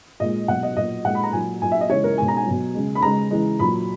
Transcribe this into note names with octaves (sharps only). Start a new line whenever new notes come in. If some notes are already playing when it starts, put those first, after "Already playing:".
A#2 G#3 D#5
B2 F#3 F#5
D#5
A#2 F#3 D#5
A#2 G#3 F#5
B5
A#5
A#2 F#3 G#5
A#2 F#3 G#5
E5
D#5
C#3 E3 G#3 C#5
A#4
B2 G#3 G#5
A#5
G#5
B2 F#3
C#3 G#3
B5
C#3 G#3 A#5
C#3 E3 G#3
A#2 F#3 B5